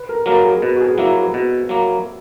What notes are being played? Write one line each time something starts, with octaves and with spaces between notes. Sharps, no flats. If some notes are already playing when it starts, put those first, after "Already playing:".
Already playing: B4
A#4
F#3 A#3 A#4
G#4
B2 B4
F#4
G#4
F#3 A#3 E4
F#4
B2
F#3 A#3